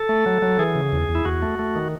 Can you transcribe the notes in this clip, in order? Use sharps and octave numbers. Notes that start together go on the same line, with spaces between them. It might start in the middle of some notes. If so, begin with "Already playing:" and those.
Already playing: A4
A3
F#3
F#3
E3 G#4
C#3
E2
E2
E4
E2 F#4
A3
A3
D#3